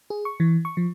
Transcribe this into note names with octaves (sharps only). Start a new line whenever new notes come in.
G#4
C#6
E3
C#6
F3